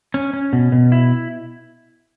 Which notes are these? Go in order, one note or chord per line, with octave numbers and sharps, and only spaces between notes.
C#4
C#4
B2
B2
E4